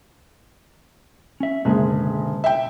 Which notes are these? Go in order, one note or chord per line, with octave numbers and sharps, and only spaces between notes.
C#4 E5
F#1 B2 D3 G#3 G#4
E5 G5